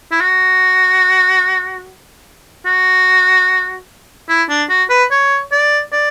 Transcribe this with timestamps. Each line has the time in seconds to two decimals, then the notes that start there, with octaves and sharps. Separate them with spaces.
0.12 E4
0.21 F#4
2.66 F#4
4.29 E4
4.50 D4
4.69 F#4
4.90 B4
5.11 C#5
5.52 D5
5.92 D5